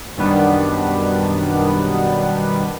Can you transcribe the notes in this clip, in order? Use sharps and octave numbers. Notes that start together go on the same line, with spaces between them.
F#2 B2 D#3 G3 B3 D4